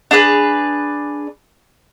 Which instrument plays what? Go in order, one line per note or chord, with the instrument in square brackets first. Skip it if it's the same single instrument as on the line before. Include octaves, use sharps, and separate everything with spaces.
[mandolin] D4 G#4 B4